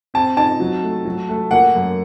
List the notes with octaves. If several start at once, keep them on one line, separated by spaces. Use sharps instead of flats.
C4 A5
D#4 A5
F#3
A3
F#3
A3
A#3 F#5
F#2